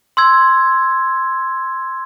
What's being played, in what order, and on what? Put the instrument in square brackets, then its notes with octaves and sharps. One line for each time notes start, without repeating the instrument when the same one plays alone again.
[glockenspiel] C6 E6 G#6